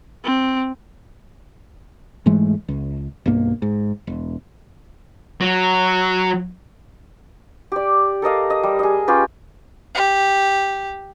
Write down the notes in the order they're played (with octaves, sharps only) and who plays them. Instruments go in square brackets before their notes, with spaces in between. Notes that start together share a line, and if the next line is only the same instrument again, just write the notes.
[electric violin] C4
[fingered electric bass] G#2 E3 G#3 A3
C#2
B1 G2 A#3
G#2
E1
[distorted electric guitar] F#3
[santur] G4 D5
A4 A#4 D#5 F5
D#5
G3
G#4 D#5
C#4 F4 G4 B4
[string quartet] G4